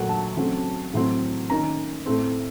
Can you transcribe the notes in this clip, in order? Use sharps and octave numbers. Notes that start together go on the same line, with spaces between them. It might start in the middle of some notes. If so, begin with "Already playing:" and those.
Already playing: A#2 F#3 A3 F#5
A5
C#3 F#3 A3 C4
A2 F#3 C4
D#3 A#3 C#4 A#5
A2 A3 C4